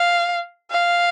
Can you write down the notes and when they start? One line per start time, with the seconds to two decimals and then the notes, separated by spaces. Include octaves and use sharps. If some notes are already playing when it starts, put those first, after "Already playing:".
Already playing: F5
0.71 F5